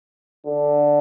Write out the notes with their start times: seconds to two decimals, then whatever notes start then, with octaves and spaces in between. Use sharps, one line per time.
0.46 D3